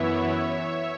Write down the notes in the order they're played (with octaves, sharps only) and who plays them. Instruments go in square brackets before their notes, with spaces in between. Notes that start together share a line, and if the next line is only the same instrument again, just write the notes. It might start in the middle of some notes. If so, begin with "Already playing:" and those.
Already playing: [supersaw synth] F#2 E3 B3 E4 C#5 E5